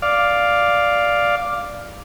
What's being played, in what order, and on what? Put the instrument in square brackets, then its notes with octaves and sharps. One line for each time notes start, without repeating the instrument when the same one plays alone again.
[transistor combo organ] D5 F5